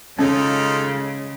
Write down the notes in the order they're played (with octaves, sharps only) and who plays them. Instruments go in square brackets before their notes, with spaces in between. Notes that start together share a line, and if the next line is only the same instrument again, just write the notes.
[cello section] C#3 G#3 [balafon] C#4 [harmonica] D#4 F4 A4